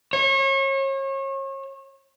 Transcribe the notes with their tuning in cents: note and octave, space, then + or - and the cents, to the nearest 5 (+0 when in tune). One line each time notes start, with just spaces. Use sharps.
C#5 -35